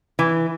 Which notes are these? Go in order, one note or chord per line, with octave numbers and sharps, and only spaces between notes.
E3